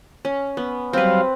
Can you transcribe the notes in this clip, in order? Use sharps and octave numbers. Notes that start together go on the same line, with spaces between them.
C#4
B3
F#3 G3 C4 B4 F5